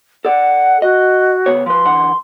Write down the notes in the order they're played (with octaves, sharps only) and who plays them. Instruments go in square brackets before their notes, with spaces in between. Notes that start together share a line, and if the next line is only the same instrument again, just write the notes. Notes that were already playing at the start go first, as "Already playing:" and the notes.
[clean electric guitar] A4 D5 [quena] F#5
[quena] F#4 [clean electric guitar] D#5
[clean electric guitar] C#3 B3 C#5
[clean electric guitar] F3 B4 [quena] C6
[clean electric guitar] D3 E3 F#5